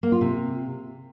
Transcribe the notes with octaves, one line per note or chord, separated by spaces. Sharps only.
A#3
F4
C3